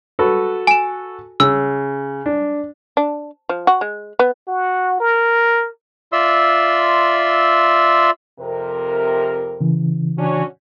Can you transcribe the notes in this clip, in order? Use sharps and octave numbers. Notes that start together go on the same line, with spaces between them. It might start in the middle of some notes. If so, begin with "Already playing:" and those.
F#4 A4 B4
G#5 E7
C#3 E6
D4
D4
F3
F#4
G#3
B3
F#4
A#4
F4 D5 E5 C6 E6
F2 C3 A#4
C#3 E3
C#4 D4 F#4